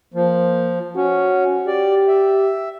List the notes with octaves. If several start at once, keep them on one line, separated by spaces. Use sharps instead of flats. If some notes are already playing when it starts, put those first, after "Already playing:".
F3 A#3
C#4 F#4
G4 D5
E5